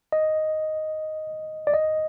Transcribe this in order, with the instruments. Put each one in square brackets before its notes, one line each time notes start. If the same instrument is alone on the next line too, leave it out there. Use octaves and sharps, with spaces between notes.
[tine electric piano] D#5
D5
D#5